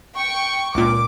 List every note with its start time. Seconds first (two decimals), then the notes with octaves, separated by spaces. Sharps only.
0.13 G5 C#6
0.75 C#2 A#2 D6